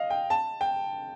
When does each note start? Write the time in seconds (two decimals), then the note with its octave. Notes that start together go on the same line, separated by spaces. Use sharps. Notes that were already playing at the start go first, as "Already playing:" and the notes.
Already playing: D#5 F5
0.10 G5
0.30 A5
0.61 G5